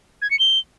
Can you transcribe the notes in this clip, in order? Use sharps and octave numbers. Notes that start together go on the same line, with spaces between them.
G#6
C#7
G7